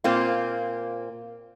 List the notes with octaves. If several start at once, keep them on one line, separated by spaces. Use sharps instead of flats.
A#2 A#3 C4 F4